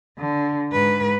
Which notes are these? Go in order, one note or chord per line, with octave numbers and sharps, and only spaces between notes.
D3
G#2 B4